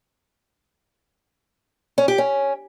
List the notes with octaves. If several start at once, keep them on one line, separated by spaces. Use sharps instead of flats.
C#4
G4
C#4